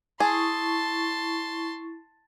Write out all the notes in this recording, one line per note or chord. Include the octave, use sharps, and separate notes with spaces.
E4 G#4 A5 C6 C#6